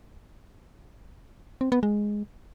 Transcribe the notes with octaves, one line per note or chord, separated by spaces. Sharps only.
C4
B3
G#3